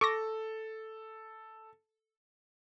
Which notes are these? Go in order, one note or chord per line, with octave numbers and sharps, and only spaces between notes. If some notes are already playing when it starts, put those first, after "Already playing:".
A4 C#6 D6 A#6